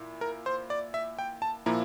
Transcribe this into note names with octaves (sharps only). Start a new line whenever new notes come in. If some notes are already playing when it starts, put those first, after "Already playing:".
Already playing: A#2 E4
A#4
C5
D5
E5
G5
A5
A#2 F3 A#3 E4 A#5